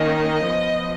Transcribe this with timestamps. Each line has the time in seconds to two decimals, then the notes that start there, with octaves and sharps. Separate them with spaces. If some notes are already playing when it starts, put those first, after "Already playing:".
Already playing: D#3 A#3 C#4 D#5
0.47 F3 B3